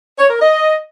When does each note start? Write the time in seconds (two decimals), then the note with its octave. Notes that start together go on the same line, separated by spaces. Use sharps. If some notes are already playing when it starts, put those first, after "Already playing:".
0.18 C#5
0.30 A#4
0.41 D#5